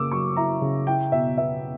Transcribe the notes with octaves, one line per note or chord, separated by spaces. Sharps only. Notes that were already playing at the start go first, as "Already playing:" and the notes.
Already playing: C#3 A#3 D6 E6
F#3 C#6
E4 A#5
C#3
E4 G5
B2 E5
B3 E5